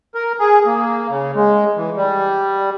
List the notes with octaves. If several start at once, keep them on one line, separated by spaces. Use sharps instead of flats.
A#4
G#4
A#3
C#3
G#3
E3
G3